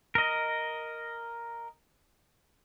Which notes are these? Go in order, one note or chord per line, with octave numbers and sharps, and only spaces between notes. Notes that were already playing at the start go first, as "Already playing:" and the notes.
A#4 D#5